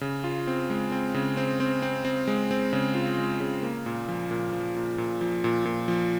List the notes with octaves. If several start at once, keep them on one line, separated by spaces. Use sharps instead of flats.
C#3
F4
C4
G#3
C4
C#3
C4
C4
C4
C4
G#3
C4
C#3
F4
G#3
C#3
A#3
A#2
F3
A#2
F3
A#2
A#2
F3
A#2
A#2
F3